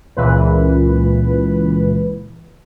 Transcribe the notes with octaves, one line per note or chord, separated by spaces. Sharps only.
C#2 A#2 E3 B4